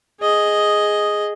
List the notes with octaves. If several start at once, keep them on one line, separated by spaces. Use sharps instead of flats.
G#4 D#5